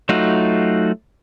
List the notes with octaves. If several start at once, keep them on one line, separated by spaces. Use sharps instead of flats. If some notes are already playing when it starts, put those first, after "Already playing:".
F#3 A3 D#4 F4 F#4